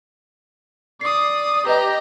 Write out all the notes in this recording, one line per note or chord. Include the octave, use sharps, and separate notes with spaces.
D5 D#6 C7
G4 B4 D#5 A#5